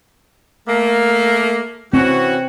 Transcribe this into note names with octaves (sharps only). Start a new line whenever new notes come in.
A3 A#3
E3 C4 C#4 F#4